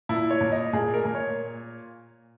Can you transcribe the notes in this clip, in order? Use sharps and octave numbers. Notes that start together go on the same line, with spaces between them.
A#2 E4
C#5
A#2
D#5
A#2 G#4
A#4
A#2
C#5